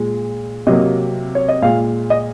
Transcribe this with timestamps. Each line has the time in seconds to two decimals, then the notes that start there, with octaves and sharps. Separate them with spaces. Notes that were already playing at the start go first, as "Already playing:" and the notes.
Already playing: A#2 G#3
0.67 C3 F#3 A#3 D#5
1.35 C#5
1.49 D#5
1.62 A#2 G#3 F5
2.10 D#5